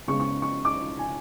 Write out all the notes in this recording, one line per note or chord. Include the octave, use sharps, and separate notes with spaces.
C#3 G#3 B3 C#6
C#6
C#6
D6
G#5